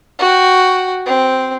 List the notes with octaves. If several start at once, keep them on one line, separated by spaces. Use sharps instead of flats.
F#4 G5
C4